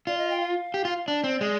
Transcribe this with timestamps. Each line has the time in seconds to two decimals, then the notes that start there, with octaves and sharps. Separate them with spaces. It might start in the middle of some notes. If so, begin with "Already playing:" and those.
0.07 F4 D5
0.18 D#5
0.30 G5
0.40 F5
0.74 G4
0.85 F4
1.08 D4 D5
1.24 C4
1.41 G#3